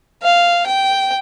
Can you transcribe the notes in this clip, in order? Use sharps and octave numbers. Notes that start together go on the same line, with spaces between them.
F5
G5